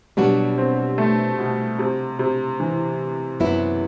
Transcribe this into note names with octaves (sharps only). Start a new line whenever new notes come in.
B2 F#3 G3 B3 D4 F#4
C4
A3
B2
C3
C3
E3
F#2 F#3 B3 E4